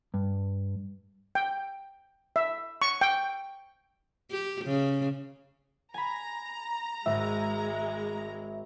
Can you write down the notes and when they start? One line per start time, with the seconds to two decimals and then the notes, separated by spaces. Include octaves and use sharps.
0.14 G2
1.35 G5
2.36 E5
2.82 C#6
3.01 G5
4.30 G4
4.65 C#3
5.94 G#5 A#5 B5
7.06 G#1 G#3 E5